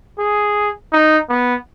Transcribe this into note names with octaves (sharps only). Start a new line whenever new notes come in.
G#4
D#4
B3